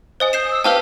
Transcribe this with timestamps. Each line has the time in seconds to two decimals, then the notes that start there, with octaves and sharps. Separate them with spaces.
0.20 C5 D#5 G#5 D#6
0.33 G6 C7 E7
0.51 E6
0.64 C4 G4 B4 F5 A5 B6